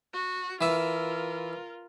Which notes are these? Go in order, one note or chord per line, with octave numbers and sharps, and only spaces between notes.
F#4
E3 F4 A#4 E5